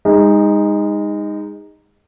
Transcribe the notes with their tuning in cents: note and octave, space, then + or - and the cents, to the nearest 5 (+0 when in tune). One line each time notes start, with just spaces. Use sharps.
G#3 -35 D#4 +0